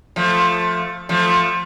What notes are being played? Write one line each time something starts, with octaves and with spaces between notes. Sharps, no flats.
F3 A3
F3 A3